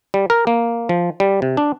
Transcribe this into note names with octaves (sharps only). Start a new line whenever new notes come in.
G3
A#4
A#3
F3
G3
C3
D4